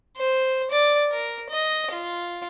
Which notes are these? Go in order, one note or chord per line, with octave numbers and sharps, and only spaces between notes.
C5
D5
A#4
D#5
F4